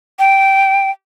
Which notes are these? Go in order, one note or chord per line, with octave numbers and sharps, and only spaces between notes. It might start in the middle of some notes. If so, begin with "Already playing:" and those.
G5